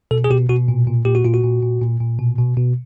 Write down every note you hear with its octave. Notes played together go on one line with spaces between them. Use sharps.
B2 A4
G#4
B2 G4
B2 F#4
A#2
A#2
A#2 G4
F#4
A#2 F4
F#4
A#2
A#2
A#2
A#2
B2
B2
B2